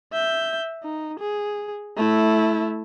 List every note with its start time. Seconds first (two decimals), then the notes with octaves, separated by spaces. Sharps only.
0.13 E5 G6
0.83 D#4
1.19 G#4
1.97 A3 E4